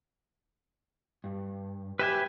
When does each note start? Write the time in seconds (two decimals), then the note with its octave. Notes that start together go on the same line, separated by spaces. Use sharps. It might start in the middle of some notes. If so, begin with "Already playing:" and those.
1.24 G2
1.99 G4 B4 E5 G5 G#5